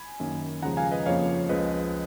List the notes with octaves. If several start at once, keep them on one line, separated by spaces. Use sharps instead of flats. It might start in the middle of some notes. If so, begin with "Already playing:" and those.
Already playing: G#5 B5
F#2 D#3 A#3
D#2 C#3 F3 G#3 F#5 A#5
F5 G#5
B4 D#5
F2 C#3 F3 A#3 C#5 F5
C#2 C#3 F3 G#3 B4 D#5